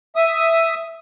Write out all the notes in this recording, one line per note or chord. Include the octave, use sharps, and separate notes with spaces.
E5 D#6